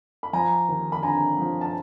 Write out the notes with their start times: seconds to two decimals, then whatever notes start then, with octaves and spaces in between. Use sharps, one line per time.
0.23 B5
0.33 F3 G#5 A#5
0.68 D#2
0.92 B5
1.03 D3 G#5 A#5
1.38 F3
1.61 A5